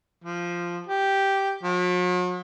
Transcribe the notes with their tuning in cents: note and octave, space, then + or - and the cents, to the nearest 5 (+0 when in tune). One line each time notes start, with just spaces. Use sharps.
F3 -5
G4 -5
F#3 -45